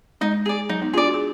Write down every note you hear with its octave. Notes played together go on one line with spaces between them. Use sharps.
G#3 D#4
G#4 D5
F#3 D#4
B3 D#4
D4 F4 G#4 D5
F#4
G#4